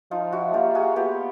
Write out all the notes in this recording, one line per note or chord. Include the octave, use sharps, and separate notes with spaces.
F3 D#4 F4
E4 F#4
A#3 F4 G4
F#4 G#4
B3 F4 G4